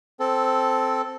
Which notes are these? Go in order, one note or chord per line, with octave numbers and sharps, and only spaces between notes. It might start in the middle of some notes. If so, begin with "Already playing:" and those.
C4 A4